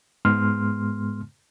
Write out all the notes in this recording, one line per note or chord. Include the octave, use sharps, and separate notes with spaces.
G#2 G#3 B3 C6 F6